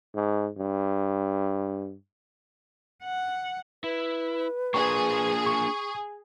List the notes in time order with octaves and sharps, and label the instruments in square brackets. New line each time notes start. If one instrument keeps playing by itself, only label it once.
[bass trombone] G#2
G2
[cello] F#5
[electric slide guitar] E4 [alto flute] B4
[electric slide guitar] A#3 D4 F4 [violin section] G#4 [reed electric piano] C#6
[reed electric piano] C#6